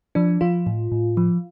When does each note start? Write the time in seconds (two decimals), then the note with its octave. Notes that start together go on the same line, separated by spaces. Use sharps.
0.15 F3 D4
0.41 F3 F4
0.67 A2
0.92 A2
1.17 F3